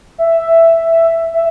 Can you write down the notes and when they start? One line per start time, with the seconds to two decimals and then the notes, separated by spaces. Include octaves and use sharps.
0.18 E5
1.34 E5